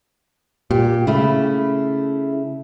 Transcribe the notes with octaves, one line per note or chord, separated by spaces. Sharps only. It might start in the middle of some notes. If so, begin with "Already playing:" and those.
A#2 G4
C#3 A3 E4